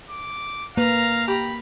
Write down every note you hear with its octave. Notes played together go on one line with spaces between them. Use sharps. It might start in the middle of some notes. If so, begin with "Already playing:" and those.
D6
A#3 B4 F5 A#5
G4 B5